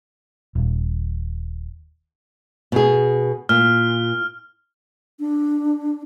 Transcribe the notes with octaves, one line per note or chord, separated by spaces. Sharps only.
D#1
B2 G#4
A#2 F6
D4